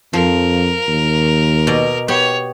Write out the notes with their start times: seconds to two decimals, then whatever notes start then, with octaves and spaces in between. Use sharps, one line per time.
0.13 F2 F3 A#4
0.88 D#2
1.67 B2 D5 D#5
2.08 B3 G4 C#5